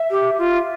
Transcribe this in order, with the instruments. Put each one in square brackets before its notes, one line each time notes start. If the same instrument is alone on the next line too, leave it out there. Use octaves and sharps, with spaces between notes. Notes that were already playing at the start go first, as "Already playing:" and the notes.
Already playing: [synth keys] E5
[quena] G4
F4